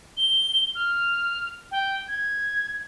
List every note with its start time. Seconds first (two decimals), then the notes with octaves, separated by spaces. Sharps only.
0.17 G7
0.75 F6
1.71 G5
2.08 G#6